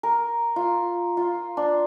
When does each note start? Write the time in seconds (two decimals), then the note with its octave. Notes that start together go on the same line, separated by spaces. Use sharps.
0.03 A#4
0.56 F4
1.17 F4
1.57 D4